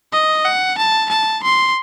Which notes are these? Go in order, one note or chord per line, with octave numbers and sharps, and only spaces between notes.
D#5
F#5
A5
A5
C6